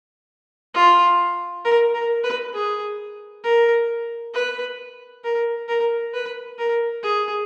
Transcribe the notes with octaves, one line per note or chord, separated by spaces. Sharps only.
F4
A#4
A#4
B4
G#4
A#4
B4
A#4
A#4
B4
A#4
G#4